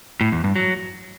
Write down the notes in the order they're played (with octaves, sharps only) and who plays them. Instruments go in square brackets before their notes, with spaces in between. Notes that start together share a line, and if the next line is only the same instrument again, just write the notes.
[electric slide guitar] A2
E2
G2
F#3